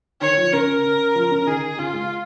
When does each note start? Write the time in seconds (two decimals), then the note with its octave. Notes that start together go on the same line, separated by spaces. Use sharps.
0.21 D#3 D#4 C#5
0.37 F3 F4
0.53 C#3 C#4 A#4
0.84 C#3 C#4
1.15 F3 F4
1.31 C#3 C#4
1.46 D#3 D#4 G#4
1.77 C#3 C#4 F4
1.94 G#3